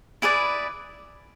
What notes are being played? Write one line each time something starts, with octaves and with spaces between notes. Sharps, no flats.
E4 G#4 B4 D5